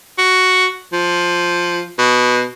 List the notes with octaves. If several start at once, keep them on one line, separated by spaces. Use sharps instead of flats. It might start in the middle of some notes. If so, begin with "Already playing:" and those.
F#4
F3
B2